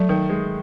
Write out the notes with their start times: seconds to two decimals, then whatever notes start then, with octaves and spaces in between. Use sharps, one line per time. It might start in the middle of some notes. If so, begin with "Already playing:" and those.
Already playing: F#3 A3
0.09 D#3
0.30 G#3